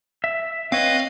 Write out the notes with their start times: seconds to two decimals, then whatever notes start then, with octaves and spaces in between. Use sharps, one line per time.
0.24 E5
0.72 C4 B4 C#5 D#5 F5